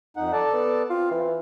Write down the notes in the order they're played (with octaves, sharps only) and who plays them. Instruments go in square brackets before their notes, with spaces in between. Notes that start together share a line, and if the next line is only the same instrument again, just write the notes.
[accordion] F2 D#4 F#5
A4 D5 A5
[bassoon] B3
[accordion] C4 [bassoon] F4
[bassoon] E3